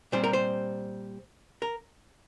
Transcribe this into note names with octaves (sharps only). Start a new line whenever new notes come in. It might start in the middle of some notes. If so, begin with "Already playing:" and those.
A#2 G3 C4 C5
A#4
C5
A#4